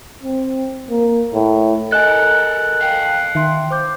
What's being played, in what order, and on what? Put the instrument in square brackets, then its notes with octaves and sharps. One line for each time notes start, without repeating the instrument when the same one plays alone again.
[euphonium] C4
A#3
A2
[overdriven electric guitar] A4 A#4 [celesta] D#5 G#5 [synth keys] F#6
[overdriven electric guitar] F5 G5
[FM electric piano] D#3 [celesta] E5 C6
[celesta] C5 D6 G6